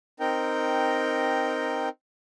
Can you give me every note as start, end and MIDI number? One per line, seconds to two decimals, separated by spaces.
0.20 1.89 60
0.20 1.89 63
0.20 1.89 70
0.20 1.89 79